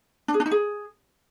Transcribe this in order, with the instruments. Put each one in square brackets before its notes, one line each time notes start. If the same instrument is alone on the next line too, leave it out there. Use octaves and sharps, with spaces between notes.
[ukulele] D4
G#4
D4
D#4
G#4